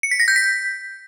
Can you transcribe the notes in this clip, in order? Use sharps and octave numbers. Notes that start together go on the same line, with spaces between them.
C#7
B6
A#6
G6
B6